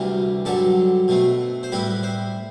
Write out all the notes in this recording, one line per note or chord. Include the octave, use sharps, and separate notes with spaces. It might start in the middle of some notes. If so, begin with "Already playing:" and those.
Already playing: D2 C3 E3 G3
G2 D3 F#3 A4
B2 A3 C4
C5
A2 G3 C4 E4 B4
C5